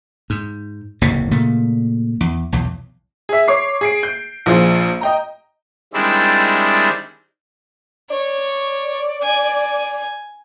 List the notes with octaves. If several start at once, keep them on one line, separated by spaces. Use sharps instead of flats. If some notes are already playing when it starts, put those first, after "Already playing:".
G#2
F#1 D#2 A2 C3
A#2 C#3 A3
E2
B1 E2
G#4 E5
C#5 D6 C7
G#4 C7 D7
G6
A#1 F3 G#4 C5
D#5 G5 A#5
D#3 G3 G#3 C4 D4 E4
C#5 D5
G#5